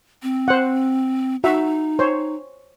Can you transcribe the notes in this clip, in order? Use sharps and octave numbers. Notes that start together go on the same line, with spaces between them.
C4
C5 F#5
D#4 F#4 E5
C5 C#5